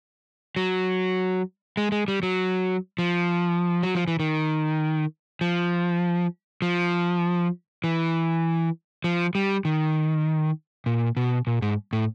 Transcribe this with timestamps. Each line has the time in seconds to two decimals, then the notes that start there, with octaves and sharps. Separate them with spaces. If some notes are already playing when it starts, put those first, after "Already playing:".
0.56 F#3
1.77 G#3
1.92 G#3
2.08 G3
2.23 F#3
2.98 F3
3.83 F#3
3.95 F3
4.08 E3
4.20 D#3
5.41 F3
6.62 F3
7.84 E3
9.04 F3
9.35 G3
9.65 D#3
10.86 A#2
11.17 B2
11.47 A#2
11.62 G#2
11.93 A2